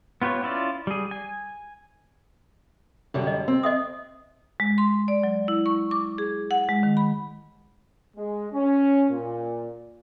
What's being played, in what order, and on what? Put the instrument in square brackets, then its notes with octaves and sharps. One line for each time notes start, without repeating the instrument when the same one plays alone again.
[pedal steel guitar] B3 F4 G4 B4 C#5
C#4 E4 F4 D5
G3 G#4
G#5
[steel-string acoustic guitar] F#2 D3 G3
[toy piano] D#5
[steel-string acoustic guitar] C4
[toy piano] D#5 E5 D#6
[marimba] G#3
C6
D5
F#3
E4
C#6
D6
G#4
F#5
G#3
D#3
B5
[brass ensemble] G#3
C#4
A#2